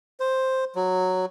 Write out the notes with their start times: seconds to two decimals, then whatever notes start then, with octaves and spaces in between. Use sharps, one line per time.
0.20 C5
0.76 F#3